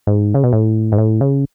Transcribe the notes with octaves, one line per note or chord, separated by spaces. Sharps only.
G#2
C#3
B2
A2
G#2
A2
C#3